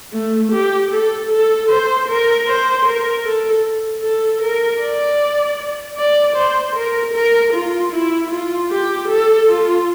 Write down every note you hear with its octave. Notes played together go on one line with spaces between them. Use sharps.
A3
G4
A4
A4
C5
A#4
C5
A#4
A4
A4
A#4
D5
D5
C5
A#4
A#4
F4
E4
F4
G4
A4
F4